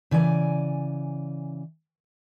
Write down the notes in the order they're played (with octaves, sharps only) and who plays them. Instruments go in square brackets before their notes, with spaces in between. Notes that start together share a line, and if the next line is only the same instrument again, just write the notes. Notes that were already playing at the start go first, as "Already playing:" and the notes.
[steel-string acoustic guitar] C#3 E3 D5 G#5